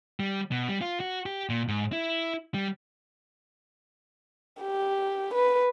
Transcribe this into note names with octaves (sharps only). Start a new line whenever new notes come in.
G3
B2
G3
F4
F#4
G4
A#2
G#2
E4
G3
G4
B4